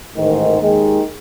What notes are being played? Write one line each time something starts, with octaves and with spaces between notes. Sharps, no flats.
A1 G#2 D#3
D#2 D#3 G#3